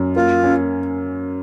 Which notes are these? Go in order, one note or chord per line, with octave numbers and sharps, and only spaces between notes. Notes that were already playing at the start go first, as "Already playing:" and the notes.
Already playing: F#2
A#3 F4
C#4